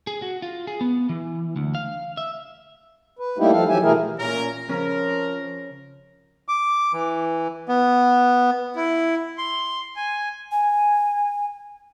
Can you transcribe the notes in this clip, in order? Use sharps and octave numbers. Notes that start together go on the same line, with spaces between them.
G#4
F#4
F4
G#4
B3
E3
D2
F5
E5
B4
G3 A3 A#3 D#4 E4 G4
F3 A4 F5
E3 F#3 G4 E5 G#5
B2 E3 A3 E4 G#4 A#4
A#2 C#4 A#4
C#3 F3 C#4 A#4
D6
E3
B3
E4
C6
G#5
G#5